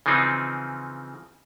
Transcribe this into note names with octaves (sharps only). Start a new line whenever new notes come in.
C#3 E3 F3 C4 D#4